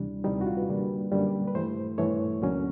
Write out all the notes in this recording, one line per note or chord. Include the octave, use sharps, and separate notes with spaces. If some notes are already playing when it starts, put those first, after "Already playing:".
Already playing: D2 C3 E3 G3 D4
D2 C3 E3 G3 D#4
F#4
F4
B4
F#2 D3 G3 A#3 D4
F#2 D3 G3 A#3 D4
B4
G2 E3 A3 C5
G2 E3 A3 C#5
D2 D3 F#3 A#3 C#4